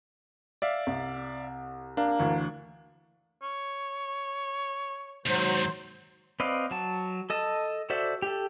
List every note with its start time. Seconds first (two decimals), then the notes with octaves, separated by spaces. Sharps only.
0.62 D5 E5 F5
0.87 C2
1.97 A#3 D4
2.19 D2 E3
3.42 C#5
5.26 D#2 G#2 F#3 C5
6.40 C4 B4 D5 D#5 F5
6.71 F#3 A5
7.30 A4 D#5 A5
7.90 F#4 A4 C5 D5 E5
8.22 G4 A4